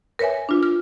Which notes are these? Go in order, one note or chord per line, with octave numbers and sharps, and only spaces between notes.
A#4 B4 C#5 E5 G#5
D4 F4
F6